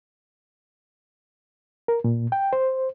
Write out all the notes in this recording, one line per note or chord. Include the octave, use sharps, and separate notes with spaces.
A#4
A#2
G5
C5